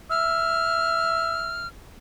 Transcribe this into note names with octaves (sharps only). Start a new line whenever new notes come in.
E5 F6